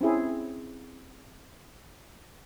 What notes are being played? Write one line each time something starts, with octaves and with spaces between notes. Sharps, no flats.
C4 C#4 E4 G#4